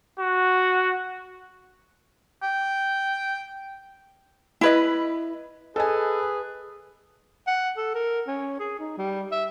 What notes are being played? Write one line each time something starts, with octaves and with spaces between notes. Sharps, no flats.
F#4
G5
E4 B4 D#5
G#4 A4 B4 D#5 G#5
F#5
A4
A#4
C#4
G#4
D#4
G3
E5